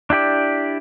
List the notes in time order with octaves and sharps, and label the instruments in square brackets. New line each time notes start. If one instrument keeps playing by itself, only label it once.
[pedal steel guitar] D4 E4 G4 D5